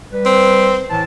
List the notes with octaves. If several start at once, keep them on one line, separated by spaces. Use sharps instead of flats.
G3 B4
C4
A2 E3 A5